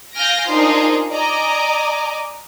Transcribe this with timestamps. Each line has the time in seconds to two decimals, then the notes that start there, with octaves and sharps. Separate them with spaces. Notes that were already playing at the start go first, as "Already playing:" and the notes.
0.16 F5 G#5 F6 G6 A#6 D7
0.50 D4 D#4 F4 G#4 A#4 C5
1.11 D5 D#5 G#5 A#5 D6